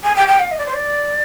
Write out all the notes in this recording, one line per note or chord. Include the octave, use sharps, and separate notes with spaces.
G#5
G5
G5
F5
D#5
D5
C5
D5